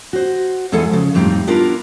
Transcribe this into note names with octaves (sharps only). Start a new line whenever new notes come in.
F#4 C5
E2 G#3 E4 A4 F#5 G#5
C#3 F3
F2 A2 G3 C4 D#4
B3 D4 E4 F4 A#4